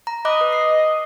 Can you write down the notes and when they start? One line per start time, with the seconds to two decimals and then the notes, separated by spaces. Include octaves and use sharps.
0.07 A#5
0.25 D#5 B5 D6 F#6
0.41 B4
0.53 C7